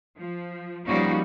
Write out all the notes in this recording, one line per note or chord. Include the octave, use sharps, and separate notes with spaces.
F3
F3 G3 A#3 C#4 D#4 F#4